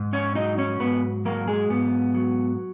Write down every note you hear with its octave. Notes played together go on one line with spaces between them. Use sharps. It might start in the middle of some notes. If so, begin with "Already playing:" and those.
Already playing: G#2
C#4 C#5
F#3 D#4 D#5
C#4 C#5
G#2 B3 B4
F#3 A#3 A#4
G#3 G#4
G#2 B3
F#3